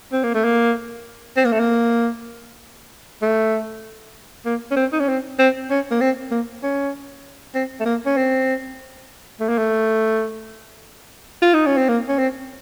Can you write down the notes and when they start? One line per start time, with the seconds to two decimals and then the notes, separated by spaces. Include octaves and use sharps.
0.12 C4
0.23 A#3
0.34 A3
0.44 A#3
1.37 C4
1.45 A#3
1.52 A3
1.59 A#3
3.22 A3
4.45 A#3
4.71 C#4
4.76 C4
4.92 D#4
4.99 C#4
5.08 C4
5.39 C4
5.70 C#4
5.91 A#3
6.01 C4
6.31 A#3
6.63 C#4
7.55 C4
7.80 A3
7.85 A#3
8.06 C#4
8.17 C4
9.40 A3
9.49 A#3
9.58 A3
11.42 F4
11.54 D#4
11.66 C#4
11.77 C4
11.88 A#3
12.08 C#4
12.18 C4